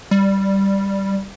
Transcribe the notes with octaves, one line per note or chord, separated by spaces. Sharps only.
G3